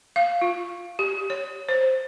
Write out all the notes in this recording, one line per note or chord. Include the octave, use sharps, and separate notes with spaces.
F5
F4
G4
C#5
C5